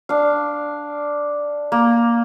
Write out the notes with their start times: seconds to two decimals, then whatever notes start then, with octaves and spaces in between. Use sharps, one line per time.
0.09 D4 F5
1.72 A#3